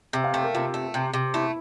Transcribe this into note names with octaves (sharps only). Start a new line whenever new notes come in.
C3 E5
F5
A3 G5
A#4
C3 F4
A3
C3
C3
A3 E4